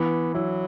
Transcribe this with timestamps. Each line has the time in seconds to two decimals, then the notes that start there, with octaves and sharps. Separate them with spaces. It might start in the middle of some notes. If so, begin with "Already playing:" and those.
Already playing: E3 B3
0.34 F#3 E4